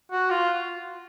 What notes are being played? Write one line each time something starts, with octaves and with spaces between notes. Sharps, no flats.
F#4
F4